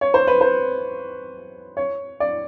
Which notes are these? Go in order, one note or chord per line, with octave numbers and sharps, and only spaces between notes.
C#5
C5
B4
C5
C#5
D5